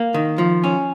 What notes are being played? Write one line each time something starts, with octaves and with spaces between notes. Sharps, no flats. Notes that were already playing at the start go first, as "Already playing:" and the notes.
Already playing: A#3
D#3
F3
C#4